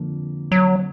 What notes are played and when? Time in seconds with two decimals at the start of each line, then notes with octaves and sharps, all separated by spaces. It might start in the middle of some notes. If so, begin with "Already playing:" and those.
Already playing: F2 D3 F3 A#3
0.52 F#3